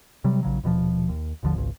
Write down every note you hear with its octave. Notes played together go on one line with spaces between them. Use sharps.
C3 F#3 G3
A#1 C#3 F#3
D#1 B2 D#3 F3
D#2
G#1 D#2 D3 F3
G#1 C#2